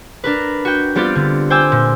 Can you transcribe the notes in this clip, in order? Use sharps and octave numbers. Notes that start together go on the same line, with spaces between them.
D4 A#4 B4
F#4 G5
G3 B3 C4 F4 G4 D5
D3
C5 G5 G#5 D6 E6
A#2